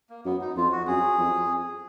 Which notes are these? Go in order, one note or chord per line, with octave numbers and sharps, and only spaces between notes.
A#3
F#2 B3
D#4
F2 F4
F#4
F#2 G#4
F2